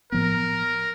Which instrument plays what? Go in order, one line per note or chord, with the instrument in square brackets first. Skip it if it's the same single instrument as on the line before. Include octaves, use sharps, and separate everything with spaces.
[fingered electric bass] A2 F3 B3 [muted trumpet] A#4